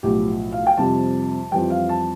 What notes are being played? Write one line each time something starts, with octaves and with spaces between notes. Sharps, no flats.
B1 A2 F3 G4
F5
G5
F2 C3 G3 A5
F2 E3 G3 G5
F5
A5